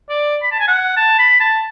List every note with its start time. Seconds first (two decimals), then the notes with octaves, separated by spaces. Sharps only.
0.10 D5
0.43 B5
0.52 A5
0.60 G#5
0.68 F#5
0.97 A5
1.19 B5
1.40 A5